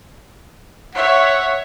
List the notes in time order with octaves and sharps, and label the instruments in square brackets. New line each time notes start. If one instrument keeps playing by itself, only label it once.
[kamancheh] C#5 E5 [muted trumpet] F#5